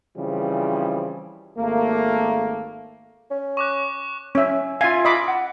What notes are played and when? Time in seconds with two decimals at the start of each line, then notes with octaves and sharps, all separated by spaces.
0.16 C#3 E3 F3 G3 C4
1.57 G#1 A3 A#3
3.31 C#4
3.57 C#6 D6 F#6
4.35 C#4 E5
4.81 F4 E5 F5 G#5
5.05 D#5 B5 D6
5.28 F#5